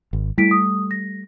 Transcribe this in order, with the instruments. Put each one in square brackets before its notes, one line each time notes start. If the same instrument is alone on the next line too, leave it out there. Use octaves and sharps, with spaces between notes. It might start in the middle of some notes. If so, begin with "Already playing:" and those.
[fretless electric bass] G#1
[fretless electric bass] G3 A3 [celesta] E4 B6 D7
[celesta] D#6
A#6